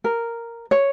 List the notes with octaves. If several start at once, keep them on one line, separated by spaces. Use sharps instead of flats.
A#4
C#5